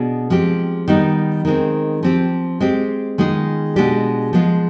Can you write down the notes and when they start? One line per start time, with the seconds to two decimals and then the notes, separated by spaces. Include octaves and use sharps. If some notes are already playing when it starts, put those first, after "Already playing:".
Already playing: B2 B3 D4 G#4
0.30 F3 G#3 C4 G4
0.88 D#3 G3 B3 D#4
1.45 D#3 G#3 C4
2.03 F3 C4 G4
2.60 G#3 C4 G4
3.18 D#3 G#3 B3 F4 G#4
3.76 B2 G#3 B3 D4 G4
4.33 F3 G#3 B3 F4